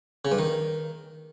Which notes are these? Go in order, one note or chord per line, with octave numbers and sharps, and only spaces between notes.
C#3
G2
D#3